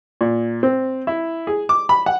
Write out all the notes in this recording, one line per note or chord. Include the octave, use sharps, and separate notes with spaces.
A#2
C4
E4
G#4
D6
B5
F#5